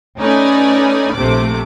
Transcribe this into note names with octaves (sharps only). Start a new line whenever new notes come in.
A3 C#4 D#4 B4 D5 G#5
A#1 C3 A3 D6